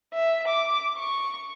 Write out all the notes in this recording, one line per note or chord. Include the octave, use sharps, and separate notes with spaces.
E5
D6
C#6